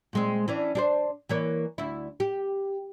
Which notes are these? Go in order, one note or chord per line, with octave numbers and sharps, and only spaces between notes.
A#2 G#3 C4
E3 C#4 D4
D4 G4 C5
E3 A#3 C#5
D2 E4
G4